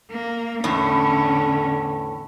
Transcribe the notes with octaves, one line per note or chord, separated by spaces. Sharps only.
A#3
E2 A2 D3 C#4